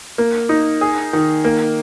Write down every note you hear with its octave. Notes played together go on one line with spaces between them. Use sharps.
A#3
D#4
G#4
D#3
A#3